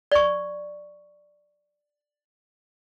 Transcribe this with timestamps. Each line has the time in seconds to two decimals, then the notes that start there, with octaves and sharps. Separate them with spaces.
0.12 D5 C#6